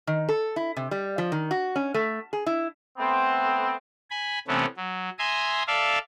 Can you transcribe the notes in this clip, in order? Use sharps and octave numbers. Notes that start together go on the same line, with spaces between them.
D#3
A4
E4
C3
G3
F3
D#3
F#4
C#4
A3
G#4
E4
A3 B3 C4
G#5 B5
C3 E3 A3 B3 C#4
F#3
E5 G#5 A#5 C6 D#6
A4 D5 E5 F5